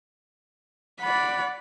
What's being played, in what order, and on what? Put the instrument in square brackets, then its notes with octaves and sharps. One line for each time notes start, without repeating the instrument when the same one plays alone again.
[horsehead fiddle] D5 F#5 [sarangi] B5